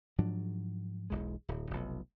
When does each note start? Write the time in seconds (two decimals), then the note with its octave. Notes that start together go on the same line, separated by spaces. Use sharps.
0.18 G#2 F3 F#3 D4
1.10 E1 B1 G#3
1.48 D1
1.71 F1 B1